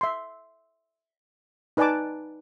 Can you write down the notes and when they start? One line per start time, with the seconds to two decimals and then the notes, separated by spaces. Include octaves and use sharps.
0.01 E5 C6
1.77 D#4 B4 D5 G#5 A5 D6